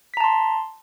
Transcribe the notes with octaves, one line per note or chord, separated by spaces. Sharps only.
A5 A#5 C6 B6